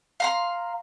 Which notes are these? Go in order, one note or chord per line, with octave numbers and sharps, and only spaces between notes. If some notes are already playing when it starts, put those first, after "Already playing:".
F5 A#5 C6